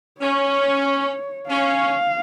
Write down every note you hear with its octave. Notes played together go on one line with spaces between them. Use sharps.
C#4 C#5
C#4 F5